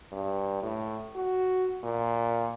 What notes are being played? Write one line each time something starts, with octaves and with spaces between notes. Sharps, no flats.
G2
A2
F#4
A#2